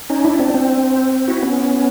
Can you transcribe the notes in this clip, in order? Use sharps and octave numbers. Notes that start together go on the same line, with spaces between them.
C#4 D#4
D4 E4
C4 D4
C4
E4 F#4
B3 C#4